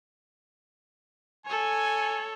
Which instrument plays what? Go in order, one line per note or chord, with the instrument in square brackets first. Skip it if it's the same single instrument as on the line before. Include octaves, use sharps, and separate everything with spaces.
[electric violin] A4 C#5 [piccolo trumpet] G#5